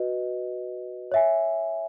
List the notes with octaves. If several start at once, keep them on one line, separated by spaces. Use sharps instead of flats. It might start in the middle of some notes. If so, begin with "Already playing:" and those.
Already playing: F#4 B4 D#5
C#5 E5 G#5